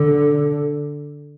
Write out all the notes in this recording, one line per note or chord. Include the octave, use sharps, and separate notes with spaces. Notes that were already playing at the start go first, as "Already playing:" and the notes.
Already playing: D3